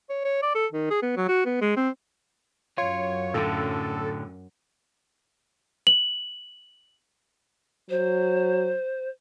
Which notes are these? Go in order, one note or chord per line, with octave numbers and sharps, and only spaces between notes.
C#5
C#5
D5
A4
D#3
G#4
B3
F#3
F#4
B3
G#3
C4
F#2 F4 C#5
A2 D3 A4
F#7
F#3 C5